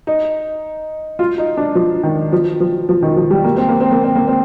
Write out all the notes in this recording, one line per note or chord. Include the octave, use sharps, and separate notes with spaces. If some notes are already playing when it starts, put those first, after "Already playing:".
D#4
F4
D#4
D4
F3
D#3
F3
F3
F3
D#3
F3
G3
A#3
C4
A#3
C4
A#3
C4
A#3
C4